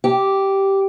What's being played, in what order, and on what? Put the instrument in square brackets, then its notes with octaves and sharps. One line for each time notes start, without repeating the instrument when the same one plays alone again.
[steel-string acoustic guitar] G4